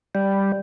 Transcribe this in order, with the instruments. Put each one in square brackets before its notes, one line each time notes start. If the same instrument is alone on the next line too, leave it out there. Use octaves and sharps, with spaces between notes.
[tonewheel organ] G3